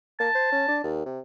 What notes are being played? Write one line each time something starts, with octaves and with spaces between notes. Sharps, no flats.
A#3 A5
C5
C#4
D4
D#2
C3